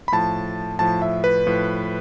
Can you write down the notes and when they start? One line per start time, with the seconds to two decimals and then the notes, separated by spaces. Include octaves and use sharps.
0.08 B5
0.12 A2 F3 A5
0.79 A2 F3 A5
1.02 E5
1.24 B4
1.46 A2 F3